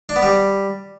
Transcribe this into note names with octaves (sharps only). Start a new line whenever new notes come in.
D4
B3
G3